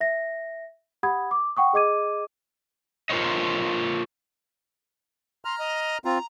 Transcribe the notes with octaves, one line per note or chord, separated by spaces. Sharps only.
E5 A#6
G4 F#5 B5 D#6 G#6
D6
F#5 G5 C#6 D#6
G#4 D#5 D6 G#6 D#7
F4 A#4 C5 C#5 D#5
A#5 C6 F6
D#5
C4 F4 A#5